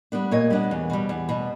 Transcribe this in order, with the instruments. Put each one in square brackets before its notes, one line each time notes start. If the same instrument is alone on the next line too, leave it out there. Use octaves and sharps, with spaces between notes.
[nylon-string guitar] G3 B3 D4
A#2 C#5 D#5
G3 B3 D4
E2
B2 G3
E2
B2 G3